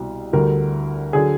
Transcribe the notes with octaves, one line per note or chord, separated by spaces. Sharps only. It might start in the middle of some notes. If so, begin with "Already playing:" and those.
Already playing: C2 B2 G3
D2 D3 G3 A#4
D3 F#3 G#4